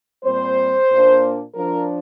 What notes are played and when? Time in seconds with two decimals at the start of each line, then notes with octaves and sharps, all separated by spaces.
0.24 A#2 G3 C4 C5
0.89 A#2 A#3 D4
1.55 F3 D4 A#4